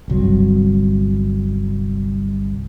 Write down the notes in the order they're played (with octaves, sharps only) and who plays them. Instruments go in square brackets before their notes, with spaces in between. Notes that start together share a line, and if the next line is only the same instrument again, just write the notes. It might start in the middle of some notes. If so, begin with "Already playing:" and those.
[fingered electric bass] G1 C2 F#3